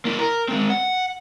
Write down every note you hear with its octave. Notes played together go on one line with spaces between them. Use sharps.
A#3 E4
A#4
G#3 C4
F#5